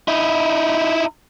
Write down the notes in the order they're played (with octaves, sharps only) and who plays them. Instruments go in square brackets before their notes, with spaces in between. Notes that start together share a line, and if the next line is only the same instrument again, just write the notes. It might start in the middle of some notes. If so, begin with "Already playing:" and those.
[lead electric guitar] D#4 E4